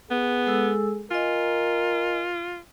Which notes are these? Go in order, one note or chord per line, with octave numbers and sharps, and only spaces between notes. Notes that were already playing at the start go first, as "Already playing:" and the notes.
B3 G#4
G#3 A4 E6
F4 A#4 D#5 G#5